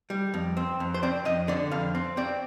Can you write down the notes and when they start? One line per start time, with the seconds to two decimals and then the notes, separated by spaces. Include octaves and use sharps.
0.10 G3
0.34 F2
0.57 C4
0.80 F2
0.94 C5
1.03 C4 D5
1.25 F2 D#5
1.48 D3 D5
1.71 F2 F5
1.95 C4
2.17 C4 D5